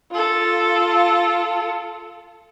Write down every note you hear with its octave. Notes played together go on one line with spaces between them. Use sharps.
F4 A4